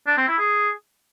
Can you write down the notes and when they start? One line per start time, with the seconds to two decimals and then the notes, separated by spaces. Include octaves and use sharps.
0.07 D4
0.18 C4
0.28 E4
0.39 G#4